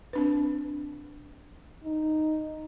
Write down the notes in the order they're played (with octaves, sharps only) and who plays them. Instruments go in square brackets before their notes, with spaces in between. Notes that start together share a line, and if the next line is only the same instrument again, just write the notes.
[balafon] C4 D4 B4
[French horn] D#4